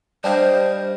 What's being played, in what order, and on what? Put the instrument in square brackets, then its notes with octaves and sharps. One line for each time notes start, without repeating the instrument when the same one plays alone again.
[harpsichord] G3 D#5 [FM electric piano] D4 G4 F5 [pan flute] C5 [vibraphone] D5